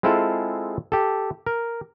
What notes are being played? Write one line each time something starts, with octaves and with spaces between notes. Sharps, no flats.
G#3 C4 E4 F4 G#4 A4
G4 A4
A#4